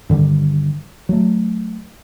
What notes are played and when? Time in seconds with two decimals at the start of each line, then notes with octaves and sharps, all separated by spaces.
0.09 G2 D3 D#3 G3
1.09 F#3 A3